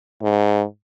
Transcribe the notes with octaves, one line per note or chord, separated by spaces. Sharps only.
G#2